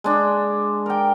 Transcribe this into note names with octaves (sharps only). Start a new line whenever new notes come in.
G#3 D4
A#4 G5